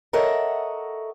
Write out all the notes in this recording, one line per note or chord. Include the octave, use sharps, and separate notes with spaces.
A4 A#4 C#5 D#5 E5 F#5